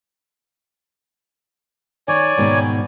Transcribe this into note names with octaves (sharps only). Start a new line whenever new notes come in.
D#3 C#5 D5 G#5
G#2 B2 D#3